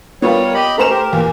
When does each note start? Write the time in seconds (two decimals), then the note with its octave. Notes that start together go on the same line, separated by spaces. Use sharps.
0.22 G3 B3 F4 A#4 C#5
0.54 G4 D#5 B5
0.78 A3 C#4 C5 A#5 E7
0.90 G4 A#4
1.12 E2 A#2